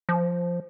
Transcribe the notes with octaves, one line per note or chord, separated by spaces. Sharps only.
F3